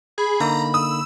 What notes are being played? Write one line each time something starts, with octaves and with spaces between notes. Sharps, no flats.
G#4 B5
D3 A#3 D#4 A#5
D#6 E6